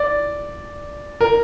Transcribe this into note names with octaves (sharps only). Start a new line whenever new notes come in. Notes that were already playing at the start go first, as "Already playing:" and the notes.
Already playing: D5
A#4